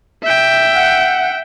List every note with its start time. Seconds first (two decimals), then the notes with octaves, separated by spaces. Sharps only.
0.23 E5 G5
0.75 F#5